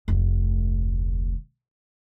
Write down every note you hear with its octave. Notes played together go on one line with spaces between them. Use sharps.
F1 D2